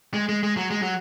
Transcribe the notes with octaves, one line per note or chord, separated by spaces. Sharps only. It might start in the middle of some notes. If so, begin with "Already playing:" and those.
G#3
G#3
G#3
F#3
G#3
F#3